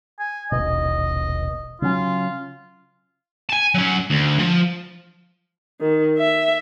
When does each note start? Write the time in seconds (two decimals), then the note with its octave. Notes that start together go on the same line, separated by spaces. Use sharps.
0.19 G#5
0.52 D#1 A1 B2 D#5
1.82 C#3 F#3 C#4 F4
3.50 G#5 A5
3.75 F#3 C#4
4.10 D2
4.39 F3
5.81 D#3
6.18 E5